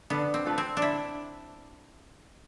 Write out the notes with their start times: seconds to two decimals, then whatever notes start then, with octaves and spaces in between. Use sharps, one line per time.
0.10 D3 B3
0.34 C4
0.46 A3 D4 F4 B4
0.58 C4
0.77 D4
0.82 D3 E4